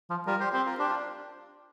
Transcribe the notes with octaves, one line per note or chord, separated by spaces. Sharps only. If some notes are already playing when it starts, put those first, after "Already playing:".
F3
G3 F4 A#4
G4 C5
C4 G4 C5
F4 A#4
D4 G4 C5
F4
D4